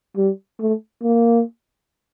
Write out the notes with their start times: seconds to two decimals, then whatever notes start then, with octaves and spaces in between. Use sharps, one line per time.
0.17 G3
0.60 A3
1.03 A#3